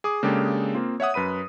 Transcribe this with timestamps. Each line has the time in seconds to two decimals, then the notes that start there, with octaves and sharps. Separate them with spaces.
0.04 G#4 D6 D#6
0.23 C#3 G#3 A#3 D4 G4 A4
0.74 A#3 C4 F4
1.00 C#5 E5 F#5 D#6
1.14 F#2 B4 B5 D#7